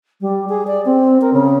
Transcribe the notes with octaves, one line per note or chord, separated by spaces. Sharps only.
G3
G#4
D5
C4
A#4
C#3